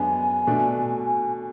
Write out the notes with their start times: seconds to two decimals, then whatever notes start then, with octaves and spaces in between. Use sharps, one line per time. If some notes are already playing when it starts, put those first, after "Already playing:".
Already playing: F#2 G#3 B3 D4 G#5
0.47 B2 A3 D4